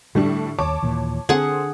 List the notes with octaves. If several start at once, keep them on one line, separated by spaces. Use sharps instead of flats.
A2 D3 G3 D4
D#2 C#5 A5 D6
D#2 A#2 E3
D3 C4 G#4 A4 F#5